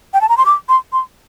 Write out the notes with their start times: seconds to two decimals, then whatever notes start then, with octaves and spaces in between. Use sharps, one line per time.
0.14 G5
0.21 A5
0.29 A#5
0.37 C6
0.46 D6
0.69 C6
0.93 C6